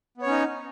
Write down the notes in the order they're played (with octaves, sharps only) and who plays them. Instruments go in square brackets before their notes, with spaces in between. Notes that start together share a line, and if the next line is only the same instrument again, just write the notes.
[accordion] B3
C#5
C#4
D#4